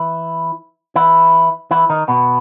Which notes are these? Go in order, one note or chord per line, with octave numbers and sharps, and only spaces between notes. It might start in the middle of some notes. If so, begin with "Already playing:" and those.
Already playing: E3 E4
E3 E4
E3 E4
D#3 D#4
B2 B3